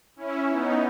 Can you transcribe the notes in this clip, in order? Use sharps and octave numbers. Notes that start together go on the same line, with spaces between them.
C#4 E4
B3 D#4